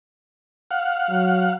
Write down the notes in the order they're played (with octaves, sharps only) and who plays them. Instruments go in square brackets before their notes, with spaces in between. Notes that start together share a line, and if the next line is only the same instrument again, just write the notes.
[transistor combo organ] F5 F#5
[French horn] F#3